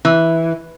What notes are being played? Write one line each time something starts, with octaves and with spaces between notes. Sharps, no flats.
E3